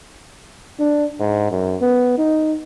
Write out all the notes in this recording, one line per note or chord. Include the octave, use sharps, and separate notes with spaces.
D4
G#2
F#2
B3
D#4